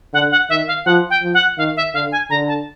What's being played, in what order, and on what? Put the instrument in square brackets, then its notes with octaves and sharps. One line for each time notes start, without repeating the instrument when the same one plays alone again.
[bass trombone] D3 [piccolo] F#5
[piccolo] F#5
[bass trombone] D#3 [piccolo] E5
[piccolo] F5
[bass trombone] F3 [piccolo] F#5
[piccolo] G5
[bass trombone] F3
[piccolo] F#5
[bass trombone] D#3 [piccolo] F5
[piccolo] E5
[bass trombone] D3 [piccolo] F5
[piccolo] G#5
[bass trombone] D3 [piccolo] A#5
[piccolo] A5